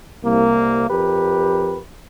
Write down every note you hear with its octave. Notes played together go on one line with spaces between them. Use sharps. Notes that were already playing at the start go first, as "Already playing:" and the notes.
C2 A#3
F2 G4 A#4 B4